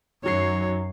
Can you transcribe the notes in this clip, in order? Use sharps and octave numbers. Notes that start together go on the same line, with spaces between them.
F#2 D#3 F#3 C#5 C7